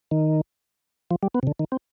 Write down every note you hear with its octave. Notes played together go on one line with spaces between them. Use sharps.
D#3
F3
G3
B3
C3
D3
D#3
C4